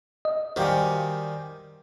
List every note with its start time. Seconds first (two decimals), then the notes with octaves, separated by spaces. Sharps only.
0.25 D#5
0.56 D#3 G3 F#4 G4 C5 F5 G5 G#5